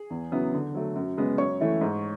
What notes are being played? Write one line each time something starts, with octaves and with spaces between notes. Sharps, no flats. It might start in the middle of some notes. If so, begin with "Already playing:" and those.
Already playing: G#4
E2
C#3 F#3 B3 E4
D3
F#3 A3
F#2
C#3 G#3 B3
F#2 C#5 C#6
E3 A3 E4
G#2